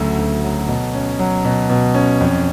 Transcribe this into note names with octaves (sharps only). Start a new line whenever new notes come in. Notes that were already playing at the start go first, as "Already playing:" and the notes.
Already playing: D2 C#3 F#3 A3
D2
F#3
B2
C#4
F#3
B2
B2
C#4
F2